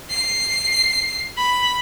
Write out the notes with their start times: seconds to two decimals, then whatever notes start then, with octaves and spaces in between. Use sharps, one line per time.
0.10 C7
1.37 B5